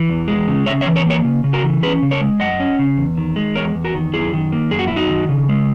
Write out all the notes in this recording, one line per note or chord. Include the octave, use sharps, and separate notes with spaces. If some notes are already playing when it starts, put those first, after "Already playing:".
Already playing: E3
E2
G#3
C#3
C#3 C#5 E5
C#5 E5
E3
A#4 C#5
A#3 A#4 C#5
C#3
C#3
F#4 A#4
E3
C#4 G#4 B4
C#3
A#4 C#5
G#3
F#2 D#5 F#5
C#4
C#3
E2
D#3
G#3
E2 A#4 C#5
E2
F#4 A#4
D#3
F#2 E4 G#4
D#3
A#3
F#2 G#4
F#4
E4
F#2
D#4 F#4
D#3
C#3
G#3